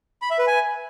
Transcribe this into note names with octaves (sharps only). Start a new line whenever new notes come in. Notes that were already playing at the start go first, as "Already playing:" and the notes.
B5
E5
B4
G#5